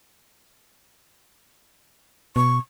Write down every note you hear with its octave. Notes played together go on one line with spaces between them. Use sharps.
B2 C#6